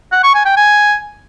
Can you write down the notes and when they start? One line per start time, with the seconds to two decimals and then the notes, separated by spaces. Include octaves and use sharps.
0.12 F#5
0.23 C#6
0.34 G#5
0.45 G5
0.57 G#5